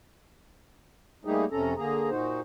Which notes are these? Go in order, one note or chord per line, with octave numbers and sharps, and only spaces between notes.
G3 A3 A#3 D#4 G4 G#4
F2 C3 C#4 A4 A#5
D3 A#3 G#4 A#5
A#2 D#4 F#4 C5